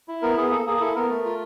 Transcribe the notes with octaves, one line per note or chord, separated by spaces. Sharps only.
E4
B3 A#4
B3 G#4
A#3 A4
A#3 G#4
G#4
E4 A4
B3 A#4
A3
F4